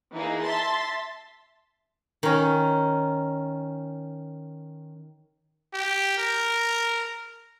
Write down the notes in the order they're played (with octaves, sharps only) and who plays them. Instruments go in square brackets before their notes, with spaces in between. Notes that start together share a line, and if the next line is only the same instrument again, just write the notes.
[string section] E3 A#3 D#4 G#4
E5 A5 C6 A6 B6
[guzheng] D#3 C#4
[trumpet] G4
A#4